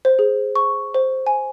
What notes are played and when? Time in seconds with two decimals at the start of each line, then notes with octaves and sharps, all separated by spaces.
0.05 C5
0.19 G#4
0.56 C#6
0.94 C5
1.27 G#5